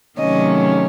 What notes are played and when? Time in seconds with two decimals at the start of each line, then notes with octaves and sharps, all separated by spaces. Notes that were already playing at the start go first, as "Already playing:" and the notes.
0.18 C3 D#3 F#3 A3 C#4 D#5